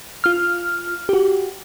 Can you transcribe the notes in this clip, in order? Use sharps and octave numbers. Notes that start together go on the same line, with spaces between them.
F4 F6
F#4 G4